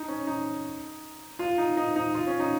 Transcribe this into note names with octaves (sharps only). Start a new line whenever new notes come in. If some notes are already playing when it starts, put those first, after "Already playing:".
Already playing: D#4
C#4
D#4
F4
D#4
D#4
D#4
F4
C#4
D#4